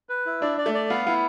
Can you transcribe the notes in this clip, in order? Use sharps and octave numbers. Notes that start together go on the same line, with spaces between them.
B4
E4
D4 D5
D5
A3
D5
B3 F5
B3 E4